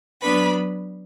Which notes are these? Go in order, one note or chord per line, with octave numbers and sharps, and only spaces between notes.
F#3 B3 D4 B4 B5